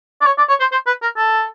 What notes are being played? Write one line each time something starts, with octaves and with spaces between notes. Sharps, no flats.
D5
C#5
D5
C#5
C5
C5
B4
A#4
A4